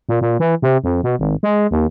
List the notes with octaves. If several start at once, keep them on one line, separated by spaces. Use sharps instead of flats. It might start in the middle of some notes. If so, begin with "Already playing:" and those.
A#2
A#2
E3
C3
F2
B2
G#1
G#3
D#2